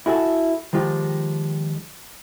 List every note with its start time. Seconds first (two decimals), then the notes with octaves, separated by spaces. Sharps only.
0.06 E4 F#4 G#4 A4
0.73 D#3 F3 G#3 F4 G4